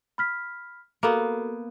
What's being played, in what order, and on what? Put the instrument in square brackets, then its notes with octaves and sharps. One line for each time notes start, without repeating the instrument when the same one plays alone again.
[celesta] B5 F6 B6
[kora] A#3 B3 [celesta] F#4 A4